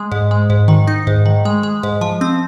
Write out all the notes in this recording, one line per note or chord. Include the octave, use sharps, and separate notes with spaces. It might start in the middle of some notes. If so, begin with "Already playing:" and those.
Already playing: G#3
G#2
G#3
G#2
D#3
D#4
G#2
D#3
G#3
G#3
G#2
F3
C4